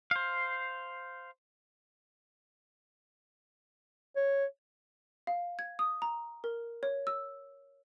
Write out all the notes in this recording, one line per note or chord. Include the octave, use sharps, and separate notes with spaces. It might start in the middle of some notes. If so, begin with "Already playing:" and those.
C5 F5
C#5
F5
G#6
D#6
A#5
A#4
C#5
E6